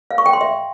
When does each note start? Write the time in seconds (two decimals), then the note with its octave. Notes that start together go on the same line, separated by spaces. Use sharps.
0.11 F5
0.18 C#6
0.26 G5
0.33 C6
0.41 E5